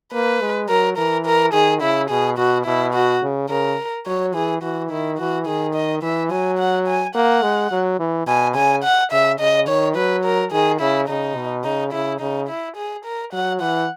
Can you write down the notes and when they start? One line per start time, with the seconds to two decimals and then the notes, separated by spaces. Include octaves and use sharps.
0.13 A#3 B4
0.41 G#3
0.69 F#3 A#4
0.97 E3 A#4
1.26 A#4
1.53 D#3 G#4
1.82 C#3 E4
2.10 B2 G#4
2.38 B2 F#4
2.66 B2 E4
2.94 F#4
3.23 C#3
3.50 C#3 A#4
4.06 F#3 C#5
4.34 E3 G#4
4.62 E3 F#4
4.91 D#3 E4
5.18 E3 F#4
5.47 D#3 G#4
5.75 D#5
6.02 E3 E5
6.31 F#3 G#5
6.59 F#5
6.87 G#5
7.15 A#3 F#5
7.43 G#3
7.72 F#3
7.99 E3
8.27 B2 G#5
8.55 C#3 G#5
8.84 F#5
9.12 C#3 E5
9.40 C#3 D#5
9.68 D#3 C#5
9.96 F#3 B4
10.25 A#4
10.52 D#3 G#4
10.81 C#3 E4
11.09 C#3 D#4
11.36 B2
11.64 C#3 D#4
11.93 C#3 E4
12.20 C#3 D#4
12.48 E4
12.77 G#4
13.05 A#4
13.33 F#3 F#5
13.61 E3 F#5